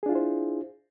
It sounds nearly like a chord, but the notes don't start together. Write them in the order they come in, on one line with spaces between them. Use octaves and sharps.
G#4 D4 F4 E4 C5